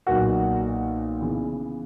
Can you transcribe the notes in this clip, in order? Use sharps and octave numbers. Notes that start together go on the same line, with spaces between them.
B1 A#2 A#3 F#4 F#5
C#3 E3 B3